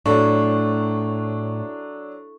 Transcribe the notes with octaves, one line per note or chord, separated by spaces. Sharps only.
A2 F#3 D4 A4 C#6